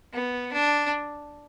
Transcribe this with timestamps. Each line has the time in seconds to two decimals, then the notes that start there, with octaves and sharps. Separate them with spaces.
0.13 B3
0.53 D4